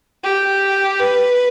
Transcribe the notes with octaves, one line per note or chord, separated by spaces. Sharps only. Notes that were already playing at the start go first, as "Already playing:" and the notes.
G4
B4